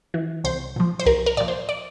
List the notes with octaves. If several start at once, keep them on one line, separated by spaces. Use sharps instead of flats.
E3
C2 C5
A#2 F3
C5
C2 A#4
A#4
A#2 F3 D5
C5
D5